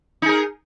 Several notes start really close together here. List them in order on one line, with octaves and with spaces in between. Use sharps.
D#4 G#4 A#4